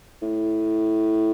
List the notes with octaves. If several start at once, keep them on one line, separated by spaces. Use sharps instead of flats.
A2